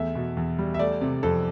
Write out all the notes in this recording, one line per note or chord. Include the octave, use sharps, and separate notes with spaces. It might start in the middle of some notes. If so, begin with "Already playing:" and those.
Already playing: E2 A3 E5
B2
E2
G3
E5
A3 D5
C3
F2 A4